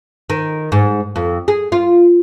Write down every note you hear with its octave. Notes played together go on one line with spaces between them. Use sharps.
D#3
G#2
F2
G#4
F4